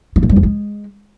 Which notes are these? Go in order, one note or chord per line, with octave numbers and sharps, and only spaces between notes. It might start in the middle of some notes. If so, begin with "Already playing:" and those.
E3
A#2
G3
F2
G#3